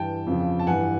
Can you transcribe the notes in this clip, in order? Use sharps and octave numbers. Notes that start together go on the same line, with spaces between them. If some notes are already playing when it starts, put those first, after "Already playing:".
Already playing: G2 E3 G5 A5
F2 C#3 F3
A5
G2 E3 F#5 G#5